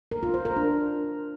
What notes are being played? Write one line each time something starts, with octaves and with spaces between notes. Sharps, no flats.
A#4
F4
C5
A#4
D4